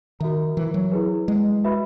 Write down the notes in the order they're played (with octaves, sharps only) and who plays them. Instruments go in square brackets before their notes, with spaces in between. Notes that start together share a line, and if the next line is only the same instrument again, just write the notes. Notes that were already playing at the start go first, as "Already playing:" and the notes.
[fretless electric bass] D#3 [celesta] F#4 A#4 E5 A#5
[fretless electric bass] E3
F#3
[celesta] E4 G#4 B4
[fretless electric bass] G#3
[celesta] F#4 B4 E5 B5